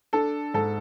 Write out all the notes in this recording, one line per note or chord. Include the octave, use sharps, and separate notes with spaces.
D4 A4
G#2 A4